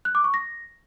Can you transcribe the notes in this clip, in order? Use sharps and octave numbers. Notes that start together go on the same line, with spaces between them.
F#6
D6
C#6
A#6